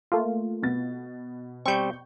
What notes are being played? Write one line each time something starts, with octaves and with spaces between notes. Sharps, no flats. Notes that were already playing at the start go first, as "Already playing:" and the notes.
A3 A#3 F4
B2 B3 A6
G3 C4 C#6 G6